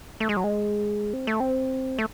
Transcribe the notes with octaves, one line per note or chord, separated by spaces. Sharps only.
A3
G#3
F#3
G#3
C4
A3
C4
A3